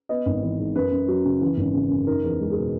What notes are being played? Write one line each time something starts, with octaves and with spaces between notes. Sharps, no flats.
B3 D#5
G#1
E3
G#2
F#2 B4
F#2
F#3
C#3
E3
G#1
C#3
F#2
D#4 A#4
E2
G#3
G#4
B2